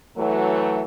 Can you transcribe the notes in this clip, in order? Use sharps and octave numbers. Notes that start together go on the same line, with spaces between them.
E3 F#3 A3